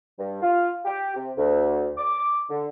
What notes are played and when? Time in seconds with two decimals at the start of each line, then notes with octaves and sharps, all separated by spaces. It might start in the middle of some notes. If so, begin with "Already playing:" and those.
0.18 G2
0.42 F4
0.85 G4
1.16 C3
1.37 D2
1.98 D6
2.50 D3